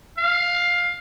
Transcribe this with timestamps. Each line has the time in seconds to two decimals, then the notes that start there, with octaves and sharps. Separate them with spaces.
0.18 F5